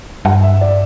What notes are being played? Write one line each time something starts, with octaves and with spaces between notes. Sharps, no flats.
G2 F#5
E5
D5